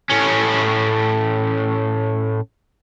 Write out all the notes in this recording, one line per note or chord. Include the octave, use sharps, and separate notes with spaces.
A2 C#4